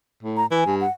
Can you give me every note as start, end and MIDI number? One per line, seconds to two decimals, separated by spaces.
0.23 0.43 45
0.37 0.46 82
0.51 0.64 52
0.51 0.75 80
0.66 0.85 43
0.81 0.91 78